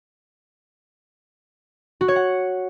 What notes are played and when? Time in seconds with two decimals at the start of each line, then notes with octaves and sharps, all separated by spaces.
2.01 F#4
2.08 C#5
2.16 F#5